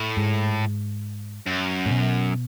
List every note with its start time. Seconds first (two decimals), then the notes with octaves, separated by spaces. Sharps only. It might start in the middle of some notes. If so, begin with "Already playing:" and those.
Already playing: A2
0.17 G#2
1.47 F#2
1.86 A2
1.91 B2